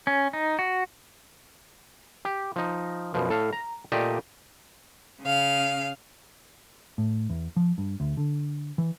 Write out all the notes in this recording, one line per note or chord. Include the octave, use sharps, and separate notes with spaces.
C#4
D#4
F#4
G4
F3 D#4
F#2 B2 F3
A2 A4 F5
A#5
A#2 A3 G4 D5 D#5 A5
C#3 F5
A2
E2
F3
G2
D2
D3
E3